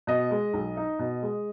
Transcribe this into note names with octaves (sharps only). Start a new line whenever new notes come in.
B2 D#5
G#3
B1
D#4
B2
G#3